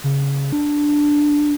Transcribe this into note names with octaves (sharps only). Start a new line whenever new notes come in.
C#3
D4